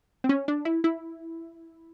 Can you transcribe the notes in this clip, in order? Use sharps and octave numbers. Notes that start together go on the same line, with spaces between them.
C4
C#4
D4
E4
E4